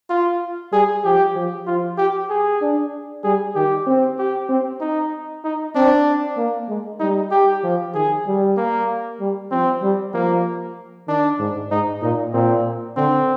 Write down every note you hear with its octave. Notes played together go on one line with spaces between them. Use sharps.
F4
G3 G#4
F3 G4
F3
F3 F4
G4
G#4
D4
G3 G#4
D#3 G4
C4
G4
C4
D#4
D#4
C4 D4
A#3
G#3
G3 D#4
G4
F3
D#3 G#4
G3
A#3
G3
F3 C4
G3
F3 A#3
D#3 D4
G#2
G#2 D#4
A#2 D#4
A#2 C4
D3 C4